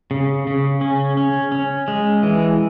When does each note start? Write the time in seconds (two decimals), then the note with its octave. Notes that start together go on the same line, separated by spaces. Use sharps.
0.11 C#3
0.47 C#3
0.81 C#4
1.17 C#4
1.52 C#4
1.88 G#3
2.23 E3